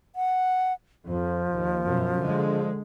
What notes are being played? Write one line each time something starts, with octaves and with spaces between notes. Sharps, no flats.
F#5
F2 F3
D#2
F#2 B2
D3 G#3